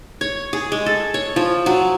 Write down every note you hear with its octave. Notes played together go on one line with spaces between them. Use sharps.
C#5
G#4
G#3
A4
C#5
F3
F#3